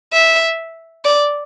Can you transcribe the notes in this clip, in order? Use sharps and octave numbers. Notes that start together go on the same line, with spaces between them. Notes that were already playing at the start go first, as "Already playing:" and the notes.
E5
D5